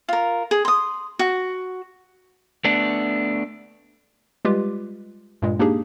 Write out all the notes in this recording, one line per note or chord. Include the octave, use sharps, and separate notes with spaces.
F4 A#4
G#4
C6 D#6
F#4
A3 B3 D4
G3 G#3 F4 G4 B4
G2 A#2 G#3
A#3 D4 D#4 G4 G#4